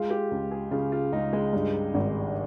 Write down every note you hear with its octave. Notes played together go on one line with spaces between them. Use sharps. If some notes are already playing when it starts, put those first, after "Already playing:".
Already playing: G#3 F4
G4
C#2
G#4
C#3 F4
F4
C#2 D#4
G#3
G2
G#1